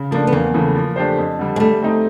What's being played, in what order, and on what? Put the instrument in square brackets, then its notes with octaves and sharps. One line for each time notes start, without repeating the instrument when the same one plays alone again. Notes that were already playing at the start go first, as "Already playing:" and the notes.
Already playing: [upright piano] C#3
[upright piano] F3 A3 D4 [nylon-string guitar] A#3
[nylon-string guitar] B3
[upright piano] E2 [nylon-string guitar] A#3
[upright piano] C#3 E3 A3
F3
A3 D4 G4 C5
F2
D3 G3
[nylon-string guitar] G#3
[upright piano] G3 [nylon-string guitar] A3
[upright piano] C4 D#4